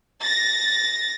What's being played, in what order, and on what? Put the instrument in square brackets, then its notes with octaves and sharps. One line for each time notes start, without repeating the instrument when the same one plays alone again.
[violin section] A6 A#6